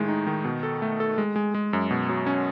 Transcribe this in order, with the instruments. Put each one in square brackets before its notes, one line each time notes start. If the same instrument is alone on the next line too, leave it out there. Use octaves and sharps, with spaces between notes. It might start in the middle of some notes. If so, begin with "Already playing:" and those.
Already playing: [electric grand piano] A2 D#3 G#3
D#4
D#3
B2
A4
A3
A4
G#3
G#3
G#3
F#2
B2
F#3
C#4